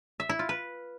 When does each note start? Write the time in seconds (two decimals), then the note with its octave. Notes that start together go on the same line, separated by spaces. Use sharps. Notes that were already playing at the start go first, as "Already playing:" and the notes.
0.20 E5
0.29 E4
0.39 F4
0.49 B4